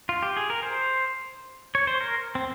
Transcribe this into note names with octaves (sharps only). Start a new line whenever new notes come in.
F4
G4
G#4
A#4
C5
C#5
C5
A#4
C4